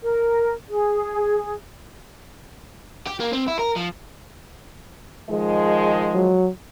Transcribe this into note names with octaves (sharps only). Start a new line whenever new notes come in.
A#4
G#4
G4
A#3
C4
E4
A#4
F3
D#3 F3 G#3
F#3